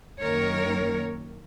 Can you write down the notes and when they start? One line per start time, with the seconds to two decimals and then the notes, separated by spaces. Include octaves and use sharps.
0.20 F#2 D#3 A#3 A#4 C#5